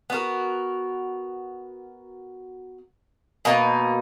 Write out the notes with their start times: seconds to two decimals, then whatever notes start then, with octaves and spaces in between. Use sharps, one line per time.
0.10 B3 F#4 A#4
3.45 B2 A#3 D#4